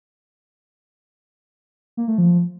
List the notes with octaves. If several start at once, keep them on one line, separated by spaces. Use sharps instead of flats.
A#3
A3
F3